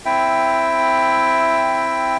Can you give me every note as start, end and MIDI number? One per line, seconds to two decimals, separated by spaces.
0.05 2.17 60
0.05 2.17 64
0.05 2.17 76
0.05 2.17 79